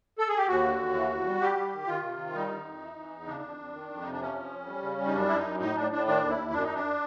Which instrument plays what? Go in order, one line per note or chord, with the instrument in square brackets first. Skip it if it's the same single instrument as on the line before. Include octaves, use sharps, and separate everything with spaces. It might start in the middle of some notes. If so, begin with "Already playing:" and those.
[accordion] A4
G#4
G4
D#2 F#4
D3
D#2
E3
E2
G3
G3 G4
G3
D#3
D#3 F4
C3
D#3
G3 D#4
D3
F2
E3
E3
E2
C#3 D4
F2
F2
D#3
F2
C3 D#4
D4
F3 C#4
F3
F2
G3
C#3
G3
D#4
F#2 D4
F#2 E4
D#4
F#2
A2 D#4
A2 D4
A2 D4
D#3 D4
D#2
E4
D#2
F#2 D4
D#4
F#2
D4